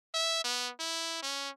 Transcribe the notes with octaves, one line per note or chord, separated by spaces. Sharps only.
E5
B3
E4
C#4